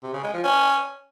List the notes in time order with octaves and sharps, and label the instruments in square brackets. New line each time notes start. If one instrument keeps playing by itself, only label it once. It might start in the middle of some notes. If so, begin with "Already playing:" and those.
[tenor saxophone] C3
C#3
G#3
F3
C#4